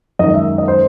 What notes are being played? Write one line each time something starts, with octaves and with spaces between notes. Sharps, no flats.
F#2 D#3 G#3 D#5
E5
D#5
C5